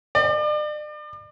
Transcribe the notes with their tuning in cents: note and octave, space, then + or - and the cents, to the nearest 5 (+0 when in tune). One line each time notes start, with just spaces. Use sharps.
D5 +40